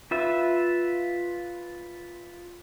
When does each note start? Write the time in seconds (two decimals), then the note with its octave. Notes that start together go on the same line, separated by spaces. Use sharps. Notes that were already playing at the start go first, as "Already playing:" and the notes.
0.11 F4 B4 E5